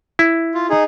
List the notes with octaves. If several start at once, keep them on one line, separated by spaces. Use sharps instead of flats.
E4
F4
D#4 G#4